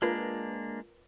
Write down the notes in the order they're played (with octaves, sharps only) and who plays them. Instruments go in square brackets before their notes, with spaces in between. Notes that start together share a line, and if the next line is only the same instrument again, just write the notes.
[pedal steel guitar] G#3 A#3 D4 [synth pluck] F4 A#4 B4